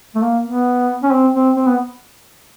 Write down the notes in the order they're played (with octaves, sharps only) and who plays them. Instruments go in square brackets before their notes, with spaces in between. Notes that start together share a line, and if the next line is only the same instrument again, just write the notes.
[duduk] A3
A#3
B3
C#4
C4
C4
C4
B3